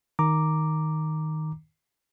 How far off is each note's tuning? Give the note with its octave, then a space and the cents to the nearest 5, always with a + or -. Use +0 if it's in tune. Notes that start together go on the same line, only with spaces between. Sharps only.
D#3 +5 A#5 +0 D6 +0